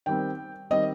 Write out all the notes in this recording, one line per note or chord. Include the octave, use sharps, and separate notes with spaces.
D#3 G3 C4 G5
D#3 G3 C4 D#5